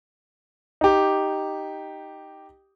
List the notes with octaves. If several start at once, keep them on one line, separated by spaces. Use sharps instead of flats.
D#4 G4